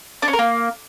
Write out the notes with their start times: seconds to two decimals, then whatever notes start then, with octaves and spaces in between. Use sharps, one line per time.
0.22 D4
0.28 C#4
0.33 A#4
0.39 A#3